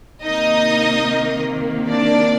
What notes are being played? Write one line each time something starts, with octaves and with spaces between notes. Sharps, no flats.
C3 D#3 A#3 D#4 D#5
D4 D5